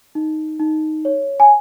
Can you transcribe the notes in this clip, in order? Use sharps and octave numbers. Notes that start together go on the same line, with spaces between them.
D#4
D#4
C#5
G#5